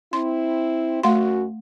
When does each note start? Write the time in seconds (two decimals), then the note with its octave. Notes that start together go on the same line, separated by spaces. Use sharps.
0.13 C4 E4 C6
1.03 F#2 A3 F#4 F#5 C6